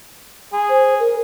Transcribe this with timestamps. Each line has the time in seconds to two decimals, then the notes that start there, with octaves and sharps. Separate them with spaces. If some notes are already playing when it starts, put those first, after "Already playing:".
0.53 G#4
0.69 C5
1.00 A#4